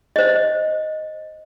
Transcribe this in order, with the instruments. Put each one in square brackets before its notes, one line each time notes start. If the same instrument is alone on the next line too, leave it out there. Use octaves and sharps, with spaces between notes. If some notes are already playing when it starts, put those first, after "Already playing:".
[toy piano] C5 D#5